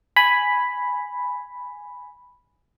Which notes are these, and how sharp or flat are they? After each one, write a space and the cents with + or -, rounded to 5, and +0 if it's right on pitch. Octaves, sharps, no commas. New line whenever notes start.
G#5 +0 B5 +0